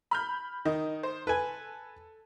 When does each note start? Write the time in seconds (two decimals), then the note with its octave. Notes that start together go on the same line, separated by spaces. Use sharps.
0.11 B5 F6 G6
0.65 D#3 D#5
1.03 C5
1.27 A4 B4 G#5